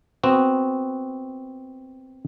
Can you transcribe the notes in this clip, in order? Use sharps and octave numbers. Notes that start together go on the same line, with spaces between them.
B3 C4 F#4